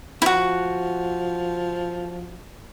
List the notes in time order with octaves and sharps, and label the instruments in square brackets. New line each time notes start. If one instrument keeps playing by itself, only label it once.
[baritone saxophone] F3 [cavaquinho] E4 F#4